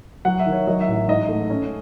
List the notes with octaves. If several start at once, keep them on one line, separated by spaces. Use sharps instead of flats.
F#3 F#5
E5
D#3
C#5
F#3 D#5
E5
A1
G#2 D#5
A3
C#4